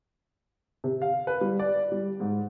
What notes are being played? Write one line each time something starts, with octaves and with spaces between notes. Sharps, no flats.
C3
F5
B4
G3
D5
G3
G#2